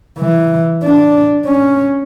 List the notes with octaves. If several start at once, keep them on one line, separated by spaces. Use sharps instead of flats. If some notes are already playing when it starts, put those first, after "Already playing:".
E3
D4
C#4